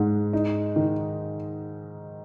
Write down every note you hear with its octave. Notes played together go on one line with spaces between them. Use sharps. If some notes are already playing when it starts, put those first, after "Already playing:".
Already playing: G#2 G#3
D#4
D#3